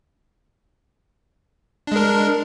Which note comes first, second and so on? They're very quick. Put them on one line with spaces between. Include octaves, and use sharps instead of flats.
D4 G#3 A#4